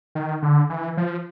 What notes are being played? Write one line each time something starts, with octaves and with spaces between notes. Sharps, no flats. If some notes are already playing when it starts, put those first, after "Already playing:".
D#3
D3
E3
F3